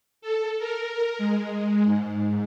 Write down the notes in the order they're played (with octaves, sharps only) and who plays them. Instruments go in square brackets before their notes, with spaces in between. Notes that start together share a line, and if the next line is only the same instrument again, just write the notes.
[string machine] A4
A#4
G#3
G#2